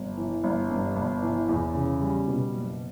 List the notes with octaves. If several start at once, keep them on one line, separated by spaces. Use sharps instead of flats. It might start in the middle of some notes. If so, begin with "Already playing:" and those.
Already playing: G1
E3
G1
G2
G1
E3
E2
C#3
G3
B2
F#1